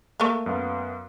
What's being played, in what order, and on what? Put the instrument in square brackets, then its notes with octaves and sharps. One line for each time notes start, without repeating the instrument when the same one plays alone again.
[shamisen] A3 A#3
[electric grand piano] F#2 B3 F5